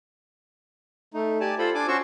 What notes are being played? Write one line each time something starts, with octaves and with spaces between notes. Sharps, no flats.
A3 D#4
G4 D5 G#5 A5
F4 A4 C5 B5
D4 G#5 D6
C#4 F#4 C5 C#6 E6